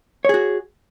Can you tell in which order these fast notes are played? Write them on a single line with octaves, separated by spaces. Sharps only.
C#5 G#4 F#4